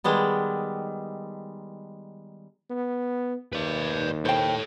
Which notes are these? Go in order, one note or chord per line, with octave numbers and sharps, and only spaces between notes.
D#3 G3 G#3 B3
B3
D#2 B4 D5
A4 C5 C#5 G5